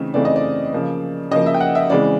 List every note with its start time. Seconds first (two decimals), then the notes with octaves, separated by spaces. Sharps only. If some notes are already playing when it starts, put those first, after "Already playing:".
Already playing: C#3 E3 A3 C4 D#4
0.14 C#3 E3 A3 C4 D#4 D5
0.25 D#5
0.36 D5
0.73 C#3 F3 A#3
1.31 C#3 F3 A#3 D#5
1.46 E5
1.54 G5
1.60 F#5
1.75 E5
1.90 C#3 E3 G#3 C4 D5